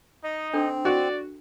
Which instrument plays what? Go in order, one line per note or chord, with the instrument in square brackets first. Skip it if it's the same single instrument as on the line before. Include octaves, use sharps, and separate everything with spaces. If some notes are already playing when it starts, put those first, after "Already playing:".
[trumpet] D#4 [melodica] D#5
[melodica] C4 [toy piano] D4 A4 G5
[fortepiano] F#4 [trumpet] D5